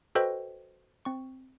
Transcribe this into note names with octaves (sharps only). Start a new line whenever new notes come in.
F#4 A4 B4 C5 D#5 G5
C4 C#6